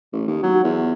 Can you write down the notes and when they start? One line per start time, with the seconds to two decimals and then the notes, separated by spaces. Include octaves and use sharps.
0.13 A1
0.28 D#2
0.43 F#3
0.64 E2